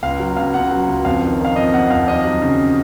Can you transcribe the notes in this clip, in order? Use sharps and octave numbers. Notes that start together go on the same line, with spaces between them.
C#2 F5
F#3
C#2 F5
C#2 F#5
F#3
C#2
F2 F5
D#3
D#3
F5
F2 D#5
F2 F#5
F2 F5
D#2 D#5
F#3
C#3